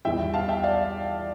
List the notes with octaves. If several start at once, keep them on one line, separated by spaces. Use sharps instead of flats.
E2 E3 G3 E5 G5
F5 A5
E5 G5
D5 F5